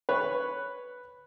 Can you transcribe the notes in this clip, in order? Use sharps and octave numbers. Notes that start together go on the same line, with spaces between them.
B4 C#5